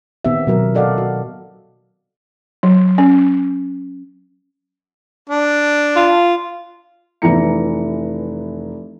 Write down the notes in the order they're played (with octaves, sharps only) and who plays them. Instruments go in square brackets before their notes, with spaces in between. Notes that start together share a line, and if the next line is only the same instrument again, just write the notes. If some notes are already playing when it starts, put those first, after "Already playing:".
[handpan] A#2 D#3 B3 C4 G4 E5
B2 F#3 A#4
F#4 A4 D5 D#5 F5 F#5
F#4
[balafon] F#3
C#4
[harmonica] D4
[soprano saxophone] F4
[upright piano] F1 E3 B3 E4 A#5 C#7